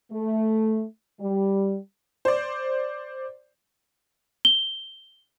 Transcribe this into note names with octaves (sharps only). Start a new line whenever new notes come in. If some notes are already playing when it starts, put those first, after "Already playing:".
A3
G3
C5 D5
G7